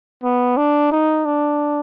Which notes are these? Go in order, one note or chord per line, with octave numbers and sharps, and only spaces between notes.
B3
D4
D#4
D4